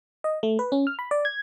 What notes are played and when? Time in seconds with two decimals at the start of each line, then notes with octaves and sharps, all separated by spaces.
0.24 D#5
0.43 A3
0.59 B4
0.72 C#4
0.87 F6
0.99 B5
1.11 D5
1.25 G#6